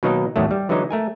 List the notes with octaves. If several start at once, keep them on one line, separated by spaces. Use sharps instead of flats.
B2 D#3 F#3 A#3 D#4 A#4
E2 A2 D#3 F#3 A3
G3
D3 E3 F#3 G#3 D#4
A3 A#4 G#5